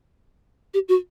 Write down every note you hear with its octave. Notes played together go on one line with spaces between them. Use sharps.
G4
F#4